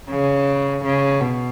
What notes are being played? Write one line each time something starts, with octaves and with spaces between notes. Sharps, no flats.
C#3
C#3
B2